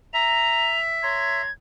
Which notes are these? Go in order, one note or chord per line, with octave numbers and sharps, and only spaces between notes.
E5 A#5 F7
C#5 A#5 C6 G#6